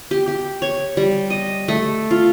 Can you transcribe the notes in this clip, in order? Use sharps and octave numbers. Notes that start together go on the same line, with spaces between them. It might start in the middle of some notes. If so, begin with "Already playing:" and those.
G4
G4
C#5
G3
D#5
A3
F4